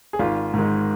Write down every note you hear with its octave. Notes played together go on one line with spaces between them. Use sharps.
G#4
G#1 F4
G#2 D#3 G#3